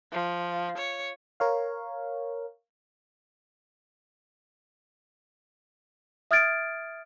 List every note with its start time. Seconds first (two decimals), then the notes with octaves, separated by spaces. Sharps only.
0.12 F3
0.78 C#5
1.40 A#4 C#5 F5
6.31 E5 D#6 F6 G#6 A6 D7